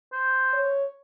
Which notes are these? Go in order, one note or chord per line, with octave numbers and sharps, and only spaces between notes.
C5
C#5